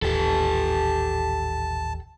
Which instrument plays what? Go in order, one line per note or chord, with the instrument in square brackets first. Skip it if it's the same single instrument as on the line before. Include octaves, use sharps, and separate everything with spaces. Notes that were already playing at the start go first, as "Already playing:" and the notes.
[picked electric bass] D#1 A1 D#2 [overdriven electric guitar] G4 A4 [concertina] A5